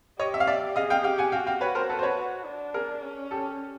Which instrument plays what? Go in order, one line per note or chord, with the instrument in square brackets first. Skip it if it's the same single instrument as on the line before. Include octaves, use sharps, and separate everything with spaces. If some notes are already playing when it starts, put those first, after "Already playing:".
[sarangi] G4 [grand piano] C#5 D#5
[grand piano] E5
F5
D5 E5
[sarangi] G#4 [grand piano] D#5 F5
[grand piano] F5 G5
[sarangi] G4 [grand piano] F5 G5
[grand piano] F#5 G#5
[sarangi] F#4 [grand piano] F5 G5
[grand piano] F5 G5
B4 C#5
A#4 C5
A4 B4
C5
B4 C#5
[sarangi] F#4
D4
[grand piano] G#4 A#4
[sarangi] C#4
[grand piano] G4 A4